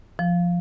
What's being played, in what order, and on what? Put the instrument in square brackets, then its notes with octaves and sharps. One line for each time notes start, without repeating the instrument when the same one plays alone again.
[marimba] F3